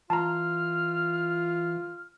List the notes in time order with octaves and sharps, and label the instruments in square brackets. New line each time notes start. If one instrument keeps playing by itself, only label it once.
[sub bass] E3 [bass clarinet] F4 [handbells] A5 A#5 [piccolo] F6